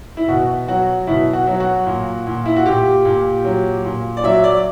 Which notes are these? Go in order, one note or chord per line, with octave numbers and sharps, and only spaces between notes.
E4
B2 F#4
F#3 F#4
B2 E4
F#4
F#3
F#4
A#2
A#2
E4
F#4
A#2 G4
A#2
F#3
A#2
D5
F#3 E5
D5